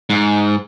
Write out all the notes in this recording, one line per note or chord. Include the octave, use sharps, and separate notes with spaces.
G#2